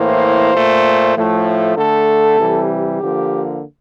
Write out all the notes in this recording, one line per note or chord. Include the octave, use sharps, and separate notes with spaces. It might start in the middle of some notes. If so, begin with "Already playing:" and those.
Already playing: A2 E3 A#3 C5
A#2 A3
A2 F3 A3
D3 A3 A4
C3 E3 G3
D3 F3 A#3 G4